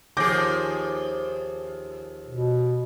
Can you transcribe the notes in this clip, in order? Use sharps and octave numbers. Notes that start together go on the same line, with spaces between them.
D#2 F3 G#4 D6 G6 A#6
B2